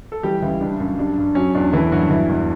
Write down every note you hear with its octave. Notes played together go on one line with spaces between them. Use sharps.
A4
E3 G3 G4
C#2 E3 E4
G3 D4
F#2
G3 D4
G2
F#3 C#4
E2 D4
E3 A3 E4
G2 F#3 F#4
E3 E4
E2